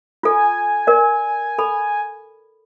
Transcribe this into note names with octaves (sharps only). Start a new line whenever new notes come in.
F4 A4 G#5
A#4 D5
A4 B5